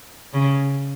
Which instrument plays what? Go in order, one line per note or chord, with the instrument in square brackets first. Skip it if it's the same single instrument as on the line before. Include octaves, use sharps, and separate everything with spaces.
[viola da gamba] C#3